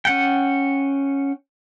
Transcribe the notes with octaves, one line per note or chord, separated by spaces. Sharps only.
C#4 F#5 G5